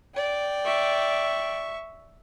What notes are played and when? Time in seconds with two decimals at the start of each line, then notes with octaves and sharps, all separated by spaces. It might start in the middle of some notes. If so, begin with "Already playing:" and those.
0.15 D5 G5
0.65 E5 C#6